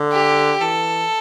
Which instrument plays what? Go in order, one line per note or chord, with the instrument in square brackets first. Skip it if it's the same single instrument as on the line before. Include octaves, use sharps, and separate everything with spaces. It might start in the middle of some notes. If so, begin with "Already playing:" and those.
Already playing: [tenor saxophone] D3
[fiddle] G4
[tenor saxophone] E3 [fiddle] A4